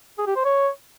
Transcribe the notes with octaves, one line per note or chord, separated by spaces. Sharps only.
G#4
G4
C5
C#5